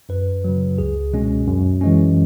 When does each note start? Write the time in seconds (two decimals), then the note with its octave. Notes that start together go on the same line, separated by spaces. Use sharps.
0.09 F#2 B4
0.44 C#3 F#3
0.78 C#2 G#4
1.13 B2 G#3 C#4
1.47 F#2
1.81 E3 G#3 C#4